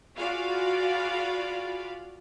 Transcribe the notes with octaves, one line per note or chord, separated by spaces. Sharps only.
F4 F#4 G#4 D5 F5 B5